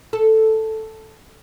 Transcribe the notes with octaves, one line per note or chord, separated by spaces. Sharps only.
A4